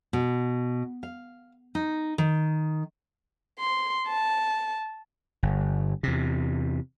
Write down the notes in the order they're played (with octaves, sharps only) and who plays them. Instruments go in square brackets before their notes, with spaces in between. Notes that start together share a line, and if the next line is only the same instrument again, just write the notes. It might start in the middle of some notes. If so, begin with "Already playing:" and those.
[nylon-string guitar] B2
F5
D#4
D#3
[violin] C6
A5
[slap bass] G1
E2 C3